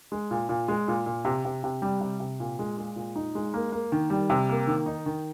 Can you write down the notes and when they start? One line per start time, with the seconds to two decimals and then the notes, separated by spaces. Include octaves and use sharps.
0.12 G#3
0.31 A#2
0.49 A#2
0.68 G#3
0.88 A#2
1.06 A#2
1.25 C3
1.45 C3
1.64 C3
1.82 G3
2.01 C3
2.20 C3
2.40 A#2
2.59 G#3
2.78 G#3
2.96 A#2
3.16 D#4
3.35 G#3
3.54 A#3
3.72 A#3
3.92 D#3
4.10 G3
4.30 C3
4.49 A#3
4.67 D#3
4.86 D#4
5.06 D#3